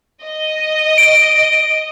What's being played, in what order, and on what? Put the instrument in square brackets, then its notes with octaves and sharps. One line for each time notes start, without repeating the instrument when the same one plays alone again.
[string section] D#5
[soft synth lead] D7